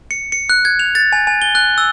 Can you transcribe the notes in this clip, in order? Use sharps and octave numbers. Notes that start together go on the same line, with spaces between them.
C#7
C#7
F#6
G#6
F7
A6
G#5
G#5
G7
F#6
E6